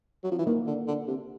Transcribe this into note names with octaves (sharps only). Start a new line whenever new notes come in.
F#3
F3
E3
D#3 A#3
D3
D3
C3